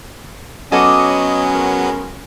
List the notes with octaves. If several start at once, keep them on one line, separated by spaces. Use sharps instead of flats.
F#3 B3 C#4 F#4 A4 D#5 D6
C#3 G#3 A#4